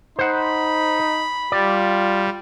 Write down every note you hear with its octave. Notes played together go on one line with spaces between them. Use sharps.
D#4 C5 F#5 B5
G3 F4 D5